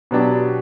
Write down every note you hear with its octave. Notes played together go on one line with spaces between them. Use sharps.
B2 F#3 B3 D4 G4